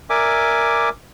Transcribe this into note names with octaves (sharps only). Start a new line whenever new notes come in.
A#4 D5 E5 G#5 D6